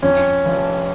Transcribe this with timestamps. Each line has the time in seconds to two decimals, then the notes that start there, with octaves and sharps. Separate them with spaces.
0.02 F2 C#4
0.45 F1